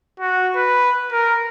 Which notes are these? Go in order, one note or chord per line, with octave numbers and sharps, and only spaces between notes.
F#4
B4
A#4